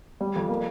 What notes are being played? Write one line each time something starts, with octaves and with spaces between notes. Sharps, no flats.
G3
F2
A#3